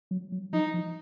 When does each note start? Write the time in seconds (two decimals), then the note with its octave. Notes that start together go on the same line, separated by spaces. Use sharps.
0.11 F#3
0.32 F#3
0.53 F3 D#4
0.74 F3